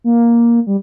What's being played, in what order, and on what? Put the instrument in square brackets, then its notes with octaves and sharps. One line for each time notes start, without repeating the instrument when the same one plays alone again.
[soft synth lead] A#3
G3